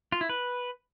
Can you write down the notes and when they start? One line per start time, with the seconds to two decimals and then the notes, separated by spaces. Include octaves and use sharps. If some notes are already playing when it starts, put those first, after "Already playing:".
0.12 F4
0.21 E4
0.29 B4